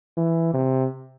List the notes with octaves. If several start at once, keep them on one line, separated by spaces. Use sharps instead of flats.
E3
C3